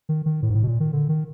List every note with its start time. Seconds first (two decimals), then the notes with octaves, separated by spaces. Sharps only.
0.09 D#3
0.26 D#3
0.42 A2
0.50 G#2
0.55 A2
0.63 B2
0.67 A#2
0.80 D#3
0.93 D3
1.09 D#3